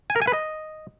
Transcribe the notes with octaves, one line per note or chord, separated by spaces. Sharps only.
G#5
A#4
G#5
B4
D#5